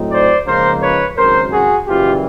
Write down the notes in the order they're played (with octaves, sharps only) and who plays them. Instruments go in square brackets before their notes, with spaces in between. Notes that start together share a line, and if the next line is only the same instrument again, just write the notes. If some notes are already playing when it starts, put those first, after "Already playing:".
Already playing: [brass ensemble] A2 F#3 A3 C4 D#4
C5 D5
C#2 C#3 F3 A#3 D#4 A#4 C5
B4 C#5
G#1 F#2 C#3 A#4 C5
F#4 G#4
F#1 F#2 C#3 E3 G3 F4 G4